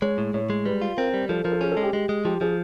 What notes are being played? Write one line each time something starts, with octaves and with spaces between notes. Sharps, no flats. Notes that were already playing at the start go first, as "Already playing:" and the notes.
G#3 C#5
A2
A2 C#5
G#3
G3 B4
F4
C4 A#4
G3
F3 A4
F3 A#4
A4
C#4 G#4
A4
G#3
G4
G#3 G4
G#3
F3 G4
F3 G#4